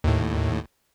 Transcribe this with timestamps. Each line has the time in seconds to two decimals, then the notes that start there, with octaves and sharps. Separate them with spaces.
0.04 D#2 A2